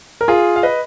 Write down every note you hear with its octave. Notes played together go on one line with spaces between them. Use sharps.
A#4
F4 G#4
F5
B4 D#5